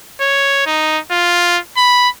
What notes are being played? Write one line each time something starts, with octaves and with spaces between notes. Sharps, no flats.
C#5
D#4
F4
B5